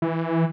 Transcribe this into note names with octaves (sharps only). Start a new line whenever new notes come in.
E3